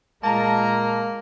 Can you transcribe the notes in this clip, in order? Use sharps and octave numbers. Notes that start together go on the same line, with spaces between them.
A#2 G#3 A#3 A5 A#5